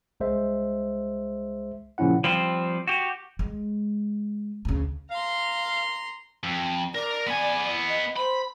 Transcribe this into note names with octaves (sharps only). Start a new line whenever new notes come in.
C2 G#3 C5 E5
A#2 C#3 F3 C#4 E4 F#5
F3 G3 C4
F#4 G4
G#3
D2 C#3
F5 A#5 C6
F2
A#4 D5
B3 G#5
D#5
C5 B5